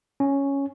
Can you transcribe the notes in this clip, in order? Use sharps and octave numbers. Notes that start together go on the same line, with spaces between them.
C#4